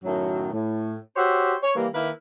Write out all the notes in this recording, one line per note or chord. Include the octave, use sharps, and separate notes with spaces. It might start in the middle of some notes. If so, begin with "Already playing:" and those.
F#2 A2 D#3 F#3
A2
F#4 G4 C5 C#5 E5
C#5
E3 G3 A#3
D#3 A#3 E4 A#4 B4